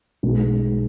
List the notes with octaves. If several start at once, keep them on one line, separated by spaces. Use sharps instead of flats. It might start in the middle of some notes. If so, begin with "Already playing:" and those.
B1 B2 G#3